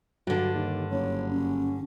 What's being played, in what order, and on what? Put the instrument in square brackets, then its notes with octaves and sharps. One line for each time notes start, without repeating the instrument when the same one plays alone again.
[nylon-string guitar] G2 D3 [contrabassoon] F#3
[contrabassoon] D#2
[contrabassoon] F#1 [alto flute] C#5
[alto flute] C#4